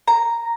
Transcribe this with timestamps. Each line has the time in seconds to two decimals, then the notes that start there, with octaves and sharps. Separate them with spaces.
0.08 A#5